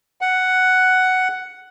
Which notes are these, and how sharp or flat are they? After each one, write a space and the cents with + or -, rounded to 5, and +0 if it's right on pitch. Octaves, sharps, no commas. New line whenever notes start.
F#5 +5